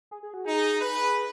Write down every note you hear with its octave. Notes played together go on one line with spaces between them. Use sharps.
G#4
G#4
F#4
D#4 G#4
B4